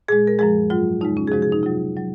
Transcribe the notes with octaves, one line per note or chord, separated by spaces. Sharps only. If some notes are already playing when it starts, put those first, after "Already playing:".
A#2 G#3 G#4
A#4
F#2 F3 G#3 G#4
G#2 F#3 F4
F2 C#3 G#3 D#4
C#4
G#4
C3 F3 G#3 F#4
G#4
D#4
C3 F#3 F4
F#3